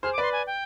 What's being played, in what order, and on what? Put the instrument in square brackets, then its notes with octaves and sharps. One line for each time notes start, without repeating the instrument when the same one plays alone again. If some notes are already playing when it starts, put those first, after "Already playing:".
[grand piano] G#4 C5 [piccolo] F6
[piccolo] D6
[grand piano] B4 D5 [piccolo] C6
[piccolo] G#5
G5